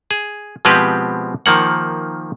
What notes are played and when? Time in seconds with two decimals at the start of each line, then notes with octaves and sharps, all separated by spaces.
0.11 G#4
0.65 B2 F3 G#3 C4 G4 B4
1.46 D#3 F3 A#3 F#5